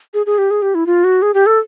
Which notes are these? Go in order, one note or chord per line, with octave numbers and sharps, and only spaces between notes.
G#4
G#4
G4
G#4
G4
E4
F4
F#4
G#4
G4
A4